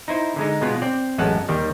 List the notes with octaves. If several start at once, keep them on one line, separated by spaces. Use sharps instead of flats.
D#4 E4 C5
D3 G#3 D#4
B2 G#3 B3 F4
C4 D5
A1 F#2 G#3 A4 F#5 A5
D#2 D#3 G3